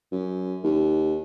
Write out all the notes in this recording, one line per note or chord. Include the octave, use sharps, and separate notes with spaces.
F#2
D#2